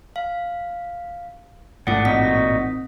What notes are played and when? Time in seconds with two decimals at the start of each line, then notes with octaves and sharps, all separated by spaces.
0.16 F5
1.87 A1 G#2 A3 F4 D5 F#5 D#6
2.05 A#2 C4 D#4 F#4 D#6 B6